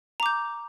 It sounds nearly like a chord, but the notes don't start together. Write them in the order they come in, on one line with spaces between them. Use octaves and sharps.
A#5 D6 G6